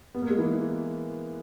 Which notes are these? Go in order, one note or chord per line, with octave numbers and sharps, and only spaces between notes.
B3
A#3
G#3
E3